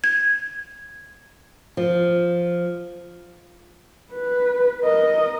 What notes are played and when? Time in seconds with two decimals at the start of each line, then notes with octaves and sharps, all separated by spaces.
0.04 G#6
1.77 F3
4.13 B4
4.83 A#4 D#5